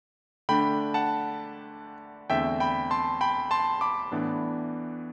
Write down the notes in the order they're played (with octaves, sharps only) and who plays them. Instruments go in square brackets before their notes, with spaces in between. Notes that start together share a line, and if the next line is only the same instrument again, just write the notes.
[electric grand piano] D3 A3 D4 G5 B5
F#5 A5
E2 D3 A3 C4 E5 G5
G5 B5
A5 C6
G5 B5
A5 C6
B5 D6
A2 E3 B3 D4